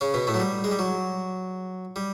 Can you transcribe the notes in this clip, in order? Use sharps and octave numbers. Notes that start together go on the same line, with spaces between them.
C#3 C#4
B2 B3
A2 A3
F#3
G3
G#3
G3
F#3
G3